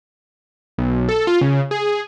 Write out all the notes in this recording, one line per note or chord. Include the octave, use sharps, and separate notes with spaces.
B1
A4
F4
C#3
G#4